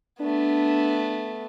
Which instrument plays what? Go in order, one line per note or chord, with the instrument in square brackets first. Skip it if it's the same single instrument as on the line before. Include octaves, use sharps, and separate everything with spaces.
[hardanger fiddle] A3 B3 [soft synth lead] D4